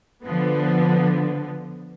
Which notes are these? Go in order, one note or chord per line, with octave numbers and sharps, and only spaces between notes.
D3 F3 B3